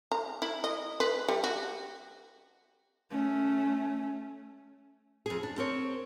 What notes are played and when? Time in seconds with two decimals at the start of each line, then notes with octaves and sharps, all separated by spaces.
0.12 A#5
0.42 E4
0.64 D#5
1.00 B4
1.28 G3
1.44 F#4
3.11 A3 C#4
5.26 F2 G#4
5.43 D4
5.58 C4 A#4 C#5